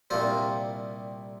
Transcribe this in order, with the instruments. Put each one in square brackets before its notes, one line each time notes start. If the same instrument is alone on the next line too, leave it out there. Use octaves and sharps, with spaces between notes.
[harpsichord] C2 A#2 G3 C4 F4